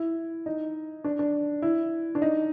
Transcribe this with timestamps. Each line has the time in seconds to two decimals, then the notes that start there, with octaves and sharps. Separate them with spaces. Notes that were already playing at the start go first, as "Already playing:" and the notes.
Already playing: E4
0.46 D#4
1.04 D4
1.19 D4
1.62 E4
2.15 D4
2.22 D#4